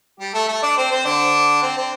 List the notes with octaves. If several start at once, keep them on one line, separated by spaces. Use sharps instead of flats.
G3 G4
A3 A4
A3 A4
D4 D5
C4 C5
C4 C5
D3 D4
C4
C4